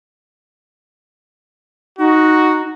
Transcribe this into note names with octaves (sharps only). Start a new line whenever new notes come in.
D#4 F#4